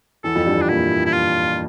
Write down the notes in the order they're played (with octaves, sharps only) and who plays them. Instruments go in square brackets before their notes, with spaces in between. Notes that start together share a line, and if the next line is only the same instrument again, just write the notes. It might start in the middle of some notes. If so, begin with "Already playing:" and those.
[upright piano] E2 E3 [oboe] A4
[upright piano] F2 F3
G2 G3
[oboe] D4
[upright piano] A#2 A#3 [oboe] E4
[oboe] E4
F4